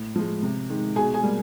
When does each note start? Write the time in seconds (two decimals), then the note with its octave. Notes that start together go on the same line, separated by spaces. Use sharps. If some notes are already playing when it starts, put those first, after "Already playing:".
Already playing: A2
0.16 F3 G#3
0.43 C3
0.70 D#3 G#3
0.96 B2 G#4 G#5
1.14 G#4 G#5
1.23 G3 A#3